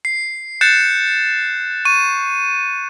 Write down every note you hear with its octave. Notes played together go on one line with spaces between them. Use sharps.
C7
F#6 G6 A6 C7 C#7 E7
C#6 D#7